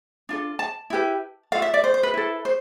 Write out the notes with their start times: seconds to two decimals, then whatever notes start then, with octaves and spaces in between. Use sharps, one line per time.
0.29 D4 F4 A4
0.59 A5
0.90 E4 G4 B4
1.52 F4 A4 F5
1.62 E5
1.74 D5
1.84 C5
1.94 C5
2.03 B4
2.14 E4 A4
2.45 C5